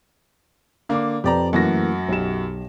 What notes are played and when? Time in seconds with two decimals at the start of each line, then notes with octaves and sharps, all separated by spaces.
0.89 D3 A#3 F5 D6
1.24 F2 G4 B4 D5 A#5
1.53 F#2 E3 A3 A#3 F#4 A#6
2.09 B1 G4 E7